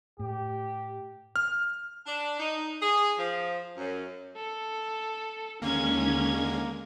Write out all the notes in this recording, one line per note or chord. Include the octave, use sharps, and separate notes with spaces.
A2 G4
F6
D4
D#4
G#4
F3
F#2
A4
D#2 D3 G#3 A#3 C#4 G#6